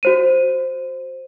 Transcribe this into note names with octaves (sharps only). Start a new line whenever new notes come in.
F#4 C5 D#7